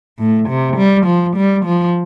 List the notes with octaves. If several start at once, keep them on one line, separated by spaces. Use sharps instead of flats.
A2
C3
G3
F3
G3
F3